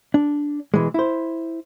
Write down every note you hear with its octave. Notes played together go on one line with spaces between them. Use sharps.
D4
B2 E3 G#3
E4 C5